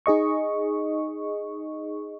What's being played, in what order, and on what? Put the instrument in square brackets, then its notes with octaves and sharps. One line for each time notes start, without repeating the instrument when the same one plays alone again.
[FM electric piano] D#4 G#4 D#5 C#6